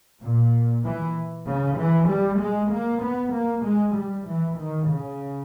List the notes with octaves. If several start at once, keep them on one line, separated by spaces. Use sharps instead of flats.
A#2
E3
C#3
E3
G3
G#3
A#3
B3
A#3
G#3
G3
E3
D#3
C#3